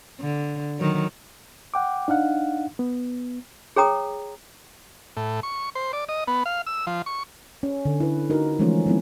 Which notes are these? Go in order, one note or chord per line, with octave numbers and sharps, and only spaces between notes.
D3
D#3 F#3
F#5 G5 D6
D4 D#4 F5 F#5
B3
G#4 C#5 G5 A#5 D#6
A2
C#6
C5
D5
D#5
B3
F5
E6
F3
C#6
C#4
D3
E4 B4
D#4 F#4 A#4
E3 F3 G#3 A3 C#4 F4
F#3 G#3 B3 C4 E4